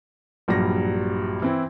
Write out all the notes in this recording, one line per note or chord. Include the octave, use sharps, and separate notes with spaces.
A#1 G2 F#3 G3 A#6
E3 C4 E4